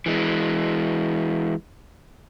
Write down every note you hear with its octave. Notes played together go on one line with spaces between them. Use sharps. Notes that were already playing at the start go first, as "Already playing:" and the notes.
E3 G#3